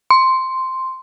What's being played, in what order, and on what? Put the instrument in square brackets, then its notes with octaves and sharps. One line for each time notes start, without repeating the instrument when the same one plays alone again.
[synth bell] C6